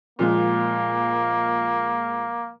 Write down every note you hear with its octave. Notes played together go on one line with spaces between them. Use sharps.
A#2 F3 G#3 A#3